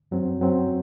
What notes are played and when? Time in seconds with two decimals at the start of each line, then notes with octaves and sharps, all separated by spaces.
0.11 F#2 F#3 C4
0.40 F#2 F#3 C4